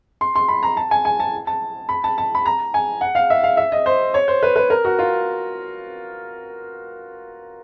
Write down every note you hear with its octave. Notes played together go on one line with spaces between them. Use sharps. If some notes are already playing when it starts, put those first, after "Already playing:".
C6
C6
B5
A#5
A5
G#5
G#5
A5
A5
B5
A5
A5
B5
A#5
G#5
F#5
F5
E5
F5
E5
D#5
C5
C#5
C5
B4
B4
A#4
F#4
F4